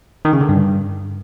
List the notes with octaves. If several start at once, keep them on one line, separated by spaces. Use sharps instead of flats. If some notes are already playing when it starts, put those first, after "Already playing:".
D#3
C#3
D3
G2